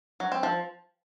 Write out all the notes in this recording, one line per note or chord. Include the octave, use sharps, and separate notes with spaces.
F#3
C4
F3